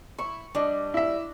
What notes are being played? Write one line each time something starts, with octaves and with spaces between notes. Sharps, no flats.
E4 C#6
G3 D4 D#5
E4 E5